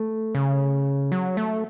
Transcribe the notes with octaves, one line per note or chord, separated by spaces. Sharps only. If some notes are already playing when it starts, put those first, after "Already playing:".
Already playing: A3
C#3
F#3
A3